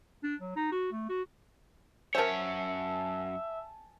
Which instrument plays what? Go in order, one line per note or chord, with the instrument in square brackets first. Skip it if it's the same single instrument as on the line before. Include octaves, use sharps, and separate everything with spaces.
[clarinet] D4
F#3
D#4
F#4
A3
F#4
[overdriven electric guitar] F#2 C#5 [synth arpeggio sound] A#4 C5 [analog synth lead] E5 [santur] G#5 A5